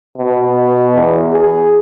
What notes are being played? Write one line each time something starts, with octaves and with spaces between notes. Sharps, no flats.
B2
E2
G#4